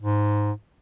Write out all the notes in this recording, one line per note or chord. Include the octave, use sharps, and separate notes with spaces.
G#2